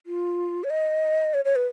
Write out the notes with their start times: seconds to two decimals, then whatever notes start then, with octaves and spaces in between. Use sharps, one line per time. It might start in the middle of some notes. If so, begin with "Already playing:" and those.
0.06 F4
0.64 C#5
0.70 D#5
1.34 C#5
1.45 C#5
1.56 B4